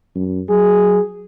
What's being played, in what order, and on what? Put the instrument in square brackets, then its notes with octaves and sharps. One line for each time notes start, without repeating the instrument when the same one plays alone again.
[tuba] F#2
[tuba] F#3 [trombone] G#4